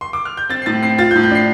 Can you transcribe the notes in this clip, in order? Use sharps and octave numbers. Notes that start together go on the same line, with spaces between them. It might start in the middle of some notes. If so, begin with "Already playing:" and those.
C6
D6
F6
G6
C4 A6
C7
A2 A6
C4 C7
F4 A6
G6
A2
G6
D4 C7